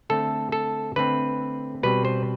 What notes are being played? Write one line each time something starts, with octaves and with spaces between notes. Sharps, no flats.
D3 A3 C4 A4
A4
D3 A3 C4 B4
B2 G3 C4 B4
C5